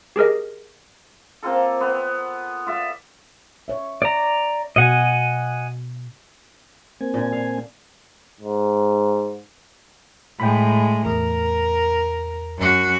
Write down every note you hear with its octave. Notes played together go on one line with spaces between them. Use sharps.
G4 G#4 A#4 D#5
A#3 C4 F4 A4
B3
F4 D5 E5
C#5 E5
D5 A#5
B2 D#5 F#5 G#5
A#3 C4 G#5
A#2 D3
F5
G#2
A2 G#3 G5 B5
E2 A#4
F#2 F#4